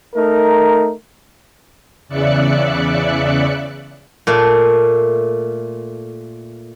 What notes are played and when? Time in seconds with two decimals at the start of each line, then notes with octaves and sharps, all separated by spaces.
0.15 A3 D#4 A#4
2.08 E2 C#3 D5 E5 F#6 C#7
4.27 A#2 A3